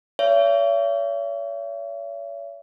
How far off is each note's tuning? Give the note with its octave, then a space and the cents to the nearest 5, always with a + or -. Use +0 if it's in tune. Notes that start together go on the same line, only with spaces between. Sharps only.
C#5 +40 E5 +40